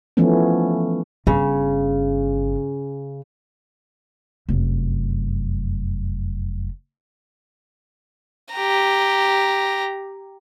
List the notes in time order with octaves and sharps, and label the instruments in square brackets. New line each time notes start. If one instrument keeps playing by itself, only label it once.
[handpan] E3 F3 A3 B3 C#4
[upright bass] G1 [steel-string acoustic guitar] C#3
[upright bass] F1 F#2
[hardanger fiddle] G4 A#5